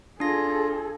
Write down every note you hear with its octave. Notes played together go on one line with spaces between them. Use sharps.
D4 F4 G#4 A4 A#6